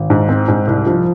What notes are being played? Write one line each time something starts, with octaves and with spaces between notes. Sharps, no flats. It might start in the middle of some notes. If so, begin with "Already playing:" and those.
Already playing: G#1
G#2
C4
G#2
C2
F3